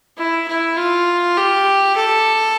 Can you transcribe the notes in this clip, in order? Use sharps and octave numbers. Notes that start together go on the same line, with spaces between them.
E4
E4
F4
G4
A4